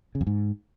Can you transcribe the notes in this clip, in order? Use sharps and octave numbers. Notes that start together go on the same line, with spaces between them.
C#3
F2
G#2